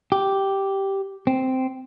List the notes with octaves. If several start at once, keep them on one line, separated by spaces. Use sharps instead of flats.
G4
C4